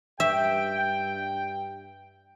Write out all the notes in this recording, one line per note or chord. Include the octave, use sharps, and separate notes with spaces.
G2 E5 G5